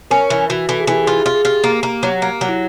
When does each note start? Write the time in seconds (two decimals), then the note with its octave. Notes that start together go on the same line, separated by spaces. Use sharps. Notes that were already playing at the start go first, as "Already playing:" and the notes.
0.11 C#4 A#4
0.30 E3 B4
0.50 E3 F#4
0.69 E3 A4
0.80 G#4
0.87 E3 G4
1.04 F4 G#4
1.26 F4
1.35 G#4
1.45 F4 G4
1.64 A#3
1.83 A#3
2.03 F#3
2.22 A#3
2.41 F#3
2.49 E4